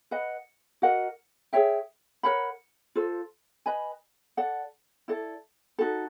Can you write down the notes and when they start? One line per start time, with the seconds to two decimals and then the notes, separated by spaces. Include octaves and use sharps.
0.11 B4 D#5 F#5
0.82 F#4 A#4 D#5 F#5
1.53 G#4 C#5 E5 G5
2.23 A#4 C#5 F#5 B5
2.95 F4 A4 C5
3.66 B4 D#5 G#5 B5
4.37 A4 D5 F#5
5.08 E4 A4 D5
5.79 D#4 F#4 A4